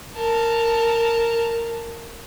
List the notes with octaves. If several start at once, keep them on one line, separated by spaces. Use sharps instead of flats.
A#4 A5